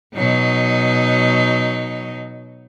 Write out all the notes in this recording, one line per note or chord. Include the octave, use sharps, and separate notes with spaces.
B2 F#3 D#4